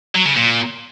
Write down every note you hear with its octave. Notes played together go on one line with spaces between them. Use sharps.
F#3
C#3
A#2